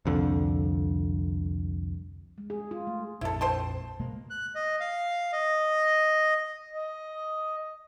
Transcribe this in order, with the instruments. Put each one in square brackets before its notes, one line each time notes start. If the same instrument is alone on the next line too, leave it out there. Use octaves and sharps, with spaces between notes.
[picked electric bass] C2 F2 D3
[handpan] G#3
G#4
F4
A3
[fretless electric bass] A#1 F2 [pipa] E4 A4
[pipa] C5 G5 A5
[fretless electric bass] B2 G#3 A#3
[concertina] F#6
D#5
F5
D#5
[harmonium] D#5